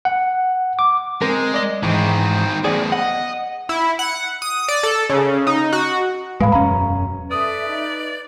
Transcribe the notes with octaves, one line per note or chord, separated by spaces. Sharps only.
F#5
D6
G#3 C4 A#4
D5 D#5
G#2 D#3 E3 C4
E2 A2 G#4 D5
D#5 F#5
E4
F#5
D#6
D5
A4
C#3
D#4
F#4
A2 G#3 B4 F5 B5
E1 F#2 C#4 A#5
A4 B4 D5 E5 D#6
D#4